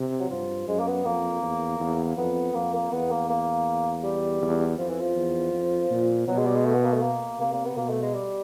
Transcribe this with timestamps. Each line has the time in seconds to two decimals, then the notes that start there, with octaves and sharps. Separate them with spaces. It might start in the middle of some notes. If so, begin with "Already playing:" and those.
Already playing: C3
0.19 F#3
0.30 G2 F3
0.67 F#2 G#3
0.79 A#3
0.87 B3
1.05 F2 A#3
1.42 E2
1.80 E2
2.17 F2 B3
2.54 F2 A#3
2.74 A#3
2.92 E2 B3
3.10 A#3
3.29 A#3
4.03 G3
4.42 E2
4.78 F2 F3
4.89 E3
5.00 F3
5.16 E2
5.53 F2
5.90 A#2
6.28 B2 F#3
6.37 G#3
6.46 G3
6.56 G#3
6.65 A3
6.74 B3
6.84 A#3
6.93 A3
7.02 A#3
7.39 C3 A#3
7.52 A#3
7.65 B3
7.76 B2 A#3
7.89 A3
8.02 G#3
8.14 G3